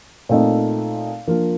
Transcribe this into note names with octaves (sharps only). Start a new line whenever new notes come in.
A#2 A3 C4 D#4
F3 A#3 D4 F4